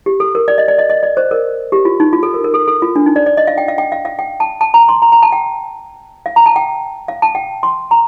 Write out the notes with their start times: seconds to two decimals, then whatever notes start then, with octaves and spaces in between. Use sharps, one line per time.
0.06 G4
0.20 A4
0.35 A#4
0.48 D5
0.58 D#5
0.68 D5
0.78 D#5
0.90 D#5
1.03 D5
1.17 C5
1.31 A#4
1.72 G4
1.85 F4
2.00 D#4
2.13 F4
2.23 A4
2.34 A#4
2.44 A#4
2.54 A4
2.68 A4
2.82 F4
2.96 D4
3.06 D#4
3.16 D5
3.26 D5
3.37 D#5
3.47 F5
3.58 G5
3.68 F5
3.78 G5
3.92 F5
4.05 F5
4.19 G5
4.40 A5
4.61 A5
4.74 A#5
4.89 C6
5.02 A#5
5.12 A#5
5.23 A5
5.32 G5
6.26 F5
6.36 A#5
6.46 A5
6.56 G5
7.08 F5
7.22 A5
7.35 G5
7.63 C6
7.91 A#5